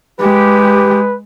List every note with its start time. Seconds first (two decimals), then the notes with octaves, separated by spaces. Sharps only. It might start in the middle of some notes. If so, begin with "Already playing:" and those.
0.20 G#3 G4 B4